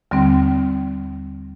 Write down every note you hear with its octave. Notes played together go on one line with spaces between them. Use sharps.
D#2 D3 G3 C4